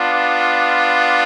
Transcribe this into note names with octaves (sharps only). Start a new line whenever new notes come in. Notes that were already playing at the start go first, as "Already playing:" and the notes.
Already playing: B3 D4 F4